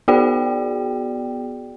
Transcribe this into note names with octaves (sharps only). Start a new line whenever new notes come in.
B3 F#4 G#4 D5 G5